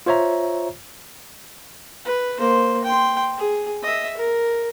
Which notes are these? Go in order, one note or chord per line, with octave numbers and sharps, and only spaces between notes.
F4 C5 C#5 E5 A#5
B4
A#3 C5
G5 C6
G#4
D#5 E5
A#4